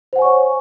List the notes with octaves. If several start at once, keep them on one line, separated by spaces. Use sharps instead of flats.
C5 C#5 F#5 G#5 C#6